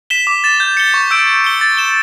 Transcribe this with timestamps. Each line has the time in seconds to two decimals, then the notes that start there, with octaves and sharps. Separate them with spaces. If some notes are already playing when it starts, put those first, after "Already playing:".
0.10 B6 E7 G7
0.27 D6
0.44 A6 E7
0.60 G6
0.77 C#7 G7
0.94 C#6
1.11 E6 G6 D7
1.27 G6
1.44 C#7 G7
1.61 A6
1.77 E7 G7